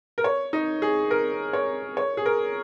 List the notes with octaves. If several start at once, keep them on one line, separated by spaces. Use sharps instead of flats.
A#4
C#5
D#4
G#4
A#4
C#5
C#5
G#4
A#4